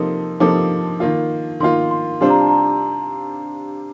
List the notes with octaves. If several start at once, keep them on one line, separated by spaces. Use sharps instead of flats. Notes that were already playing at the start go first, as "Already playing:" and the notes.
Already playing: C3 F3 A#3 D#4 A4 C6
C3 F3 A#3 D#4 A4 D6
D#3 A#3 F4
D#3 A#3 F4 C6
C6
C3 G3 D4 F4 C5 C6
A#5
A5
A#5